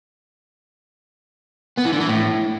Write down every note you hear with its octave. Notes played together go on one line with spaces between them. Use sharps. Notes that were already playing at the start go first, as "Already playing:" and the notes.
B3
E3
D3
E3
A2